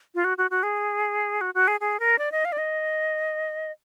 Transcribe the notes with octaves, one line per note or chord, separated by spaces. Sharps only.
F4
F#4
F#4
F#4
G#4
F#4
F#4
G#4
G#4
A#4
D5
D#5
F5
D5
D#5